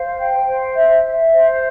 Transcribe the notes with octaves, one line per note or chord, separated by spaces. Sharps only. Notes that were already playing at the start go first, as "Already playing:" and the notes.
Already playing: C5 F5
G5
C5
E5
E5
C5